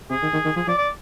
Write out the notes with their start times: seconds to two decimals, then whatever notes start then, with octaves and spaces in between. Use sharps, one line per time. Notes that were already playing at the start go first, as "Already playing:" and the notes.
0.10 C3 G#4
0.22 D#3
0.33 D#3
0.45 D#3
0.56 F3 G#4
0.67 F3 D5
0.78 D5